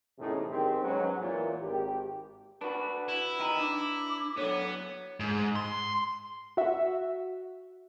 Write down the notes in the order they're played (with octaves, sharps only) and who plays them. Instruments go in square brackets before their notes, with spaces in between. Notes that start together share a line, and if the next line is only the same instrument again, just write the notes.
[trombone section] E2 A2 C3 C#4 D#4 G#4
G2 D#3 C4 G4 G#4 C5
G#2 F#3 B3 C#4
E2 A#2
G#1 G4
[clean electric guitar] D4 F#4 [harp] B4
[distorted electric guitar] E4
[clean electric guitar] D#3 D#5 A#5
[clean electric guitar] D4 [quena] D6
[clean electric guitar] D3 F#3 [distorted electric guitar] B3 [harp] C#5
[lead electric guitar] G#2
C6
[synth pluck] F#4 E5